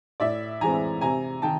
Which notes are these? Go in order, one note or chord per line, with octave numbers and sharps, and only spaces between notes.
A2 D5 E5
E3 G#3 C4 G#5 A#5
C3 G#5 A#5
D#3 G5 A5